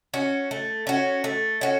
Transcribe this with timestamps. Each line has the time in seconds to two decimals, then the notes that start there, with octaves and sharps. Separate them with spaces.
0.14 C#4 F#4
0.51 A3
0.87 C#4 F#4
1.24 A3
1.61 C#4 F#4